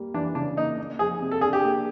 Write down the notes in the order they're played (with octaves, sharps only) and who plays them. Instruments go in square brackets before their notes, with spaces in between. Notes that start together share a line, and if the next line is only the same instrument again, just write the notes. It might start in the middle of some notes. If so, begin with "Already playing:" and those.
Already playing: [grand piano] G3 A#3
[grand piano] E3 [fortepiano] D4
[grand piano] C#3 [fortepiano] D4
[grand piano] A#3 [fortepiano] D#4
[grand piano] A#3
[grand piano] F3 [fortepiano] G#4
[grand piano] C3
[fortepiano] A4
[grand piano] D4 [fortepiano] G#4
[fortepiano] G4
[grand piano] A#3